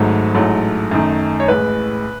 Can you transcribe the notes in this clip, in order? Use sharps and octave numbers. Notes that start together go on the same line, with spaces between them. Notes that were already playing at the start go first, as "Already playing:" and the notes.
Already playing: G#1 G#2 F#3 A3
A1 G#2 F#3 A3
F#2 D#3 A3
C#5
A1 A2 G#3 B4